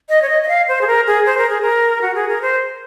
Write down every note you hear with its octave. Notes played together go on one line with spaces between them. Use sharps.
D#5
C#5
D#5
D#5
F5
C5
G#4
A#4
G#4
C5
A#4
G#4
A#4
F#4
G#4
A#4
C5